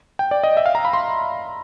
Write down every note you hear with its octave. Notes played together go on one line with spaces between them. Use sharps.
G5
D5
D#5
E5
F5
A#5
B5
C6